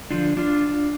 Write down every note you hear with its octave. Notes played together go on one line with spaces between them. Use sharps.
D3 F3 D4 F4
D4 F4